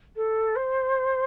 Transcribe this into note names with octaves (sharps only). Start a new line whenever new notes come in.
A4
C5